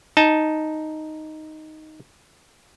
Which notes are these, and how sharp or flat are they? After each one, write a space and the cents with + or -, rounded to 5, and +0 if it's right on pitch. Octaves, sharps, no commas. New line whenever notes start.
D#4 +0 A5 +0